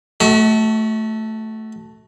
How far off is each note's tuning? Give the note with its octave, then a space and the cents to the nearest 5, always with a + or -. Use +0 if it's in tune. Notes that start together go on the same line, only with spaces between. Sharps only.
A3 +0 F#4 +25 E5 -40